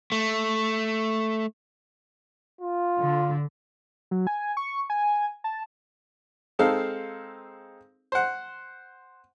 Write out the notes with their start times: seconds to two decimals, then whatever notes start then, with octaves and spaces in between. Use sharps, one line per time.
0.12 A3
2.61 F4
3.02 D3
4.11 F#3
4.27 G#5
4.57 C#6
4.90 G#5
5.44 A5
6.59 G#3 C4 D#4 A4 F5
8.12 C5 F#5